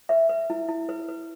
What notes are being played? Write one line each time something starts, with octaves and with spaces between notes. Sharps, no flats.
B4 E5
B4
E4
E4
B4
B4